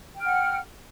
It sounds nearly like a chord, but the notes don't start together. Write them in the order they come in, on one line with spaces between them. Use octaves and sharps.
G5 F6 F#5